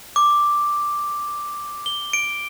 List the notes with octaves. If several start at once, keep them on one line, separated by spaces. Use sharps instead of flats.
D6
G7
D7